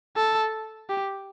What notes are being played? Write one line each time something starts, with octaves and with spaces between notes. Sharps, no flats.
A4
G4